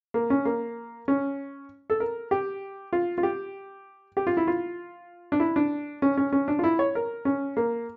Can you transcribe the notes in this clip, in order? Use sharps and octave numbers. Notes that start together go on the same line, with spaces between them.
A#3
C#4
A#3
C#4
A4
A#4
G4
F4
F4
G4
G4
F4
E4
F4
D4
E4
D4
C#4
C#4
C#4
D4
F4
E4
C#5
A#4
C#4
A#3